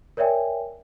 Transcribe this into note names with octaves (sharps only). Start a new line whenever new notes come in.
A#4 C#5 D5 E5 G5 G#5